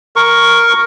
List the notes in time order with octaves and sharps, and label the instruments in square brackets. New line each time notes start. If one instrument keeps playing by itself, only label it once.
[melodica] A#4 C#6